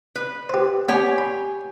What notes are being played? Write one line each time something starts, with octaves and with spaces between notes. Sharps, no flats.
B4
G4 C5
B3 G4 C#5 G#5
B5